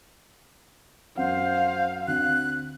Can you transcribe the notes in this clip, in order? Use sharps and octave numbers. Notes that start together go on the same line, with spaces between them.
F#2 C5 F5 F#5
D2 C4 D4 F#6